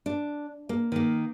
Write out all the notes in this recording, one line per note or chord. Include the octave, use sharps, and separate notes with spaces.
D4
A#3
D#3 A#3